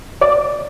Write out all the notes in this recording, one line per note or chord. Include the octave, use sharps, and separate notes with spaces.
D5